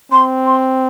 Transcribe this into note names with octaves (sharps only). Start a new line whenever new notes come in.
C4 C6
C6